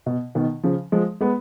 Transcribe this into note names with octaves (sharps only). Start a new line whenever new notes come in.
B2
B2 D#3
C#3 F3
F3 G#3
G#3 B3